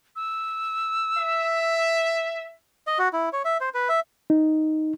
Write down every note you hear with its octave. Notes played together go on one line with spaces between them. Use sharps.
E6
E5
D#5
F#4
E4
C#5
E5
C5
B4
E5
D#4